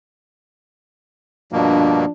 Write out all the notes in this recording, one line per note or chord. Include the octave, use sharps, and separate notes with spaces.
G2 B2 F3 A#3 D4